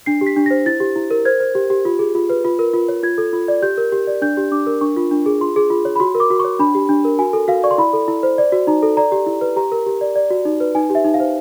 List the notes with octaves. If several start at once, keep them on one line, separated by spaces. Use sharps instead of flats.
D4 C7
G4
B6
D4
C5 A#6
E4 A6
G4
E4
A#4
C5 G#6
C5
G4
G4
F4
G#4
F4
B4
F4
A#4
F4
C#5
F4 G#6
A4
F4
D5
G4 G6
A#4
G4
D5
D4 G6
G4
D4 D6
A#4
D4 C#6
F4
D4
G#4
F4 C6
G#4
F4
C#5
B5
F#4 C6
A#4
D6
F#4
C#5 C#6
D4 B5
G4
D4
A#4
F#4 G#5
A4
F#4 F5
D5 C#6
C6
E4 B5
A4
E4
C5
D5
F#4
D#4 A#5
A4
D5 A#5
G4
E4
B4
G4 A#5
A#4
G4
D5
D5
F#4
D#4
B4
D#4 G#5
G4
E5
D#4
F5
C5